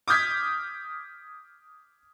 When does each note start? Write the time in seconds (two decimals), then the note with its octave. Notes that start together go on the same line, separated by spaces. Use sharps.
0.08 D6 D#6 F6 G6 G#6 B6